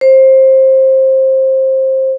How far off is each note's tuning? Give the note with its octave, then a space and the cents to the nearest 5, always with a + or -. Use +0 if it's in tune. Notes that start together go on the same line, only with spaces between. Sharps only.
C5 +20